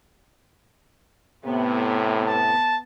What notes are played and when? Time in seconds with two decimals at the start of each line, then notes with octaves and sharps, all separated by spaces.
1.45 A2 C3 B3
2.27 A5